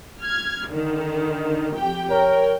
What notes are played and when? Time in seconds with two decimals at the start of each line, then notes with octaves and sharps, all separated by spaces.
0.20 F6 G#6
0.69 D3 D#3
1.75 F2 G4 G5
2.11 A#4 C#5 G5